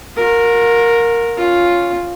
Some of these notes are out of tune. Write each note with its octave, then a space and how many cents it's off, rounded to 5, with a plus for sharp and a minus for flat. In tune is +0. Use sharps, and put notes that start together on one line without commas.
F#4 -45 A#4 +0
C#4 +0 F4 +0